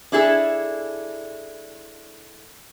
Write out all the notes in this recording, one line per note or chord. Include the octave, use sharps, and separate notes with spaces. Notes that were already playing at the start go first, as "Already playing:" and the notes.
D4 E4 G#4 A4